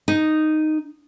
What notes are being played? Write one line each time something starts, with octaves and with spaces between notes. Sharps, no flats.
D#4